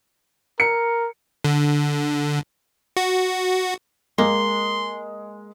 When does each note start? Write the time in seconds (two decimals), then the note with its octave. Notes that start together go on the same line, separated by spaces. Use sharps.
0.60 A#4 C#7
1.44 D3
2.97 F#4
4.18 G#3 A#3 C6